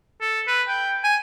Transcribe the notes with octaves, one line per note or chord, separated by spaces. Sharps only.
A4
B4
G5
G#5